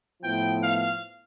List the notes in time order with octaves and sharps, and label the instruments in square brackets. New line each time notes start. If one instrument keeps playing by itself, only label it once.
[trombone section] A2 F3 B3 E4 [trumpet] G5
[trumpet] F5